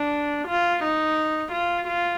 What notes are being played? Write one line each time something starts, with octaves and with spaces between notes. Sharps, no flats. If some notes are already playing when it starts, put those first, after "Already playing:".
Already playing: D4
F4
D#4
F4
F4